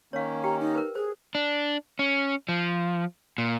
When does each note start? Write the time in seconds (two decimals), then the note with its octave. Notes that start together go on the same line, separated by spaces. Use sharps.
0.13 D#3 A#3 C#4 C#5 F5
0.44 G4 G5 A#5
0.60 D#4
0.75 A#4 B4
0.95 G#4 C5
1.35 D4
1.99 C#4
2.49 F3
3.38 A#2